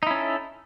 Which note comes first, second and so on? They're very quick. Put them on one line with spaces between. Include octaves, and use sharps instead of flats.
D#4 E4 C#4 A4